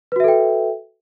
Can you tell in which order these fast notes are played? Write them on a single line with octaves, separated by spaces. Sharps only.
B4 F#4 E5 A4 G5